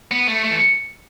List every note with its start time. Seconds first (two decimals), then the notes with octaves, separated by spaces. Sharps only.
0.11 B3
0.27 A3
0.44 A3
0.50 E3